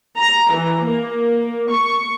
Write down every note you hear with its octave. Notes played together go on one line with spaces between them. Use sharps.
A#5
E3
A#3
C#6